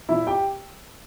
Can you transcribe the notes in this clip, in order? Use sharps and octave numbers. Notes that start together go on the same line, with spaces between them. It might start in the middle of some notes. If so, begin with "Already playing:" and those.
A#2 F3 E4 E5
G4 G5